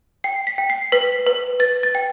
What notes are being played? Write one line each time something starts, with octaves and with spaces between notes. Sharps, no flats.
G5 C7
B6
G5
C7
B4 B6
B4
B4 A6
A6
G5